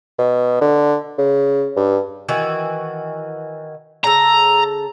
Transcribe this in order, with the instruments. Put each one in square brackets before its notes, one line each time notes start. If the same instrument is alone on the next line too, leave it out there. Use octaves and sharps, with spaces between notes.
[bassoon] B2
D3
C#3
G2
[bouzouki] D#3 E3 F#4
[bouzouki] C#3 A4 [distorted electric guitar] A#5